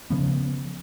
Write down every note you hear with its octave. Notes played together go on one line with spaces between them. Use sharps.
C#3 F3 B3